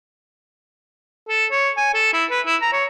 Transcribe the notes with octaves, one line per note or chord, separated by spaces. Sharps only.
A4
C#5
G#5
A4
E4
B4
E4
A#5
C#5